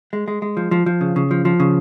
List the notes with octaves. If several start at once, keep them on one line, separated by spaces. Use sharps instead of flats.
G#3
G#3
G#3
F3
F3
F3
C#3
C#3
F3
F3
C#3